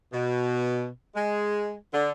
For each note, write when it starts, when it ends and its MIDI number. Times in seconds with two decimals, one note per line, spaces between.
0.13 0.88 47
1.15 1.75 56
1.93 2.11 50